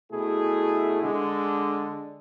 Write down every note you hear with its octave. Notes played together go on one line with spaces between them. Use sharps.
B2 A3 E4 G#4
D3 G#3 D4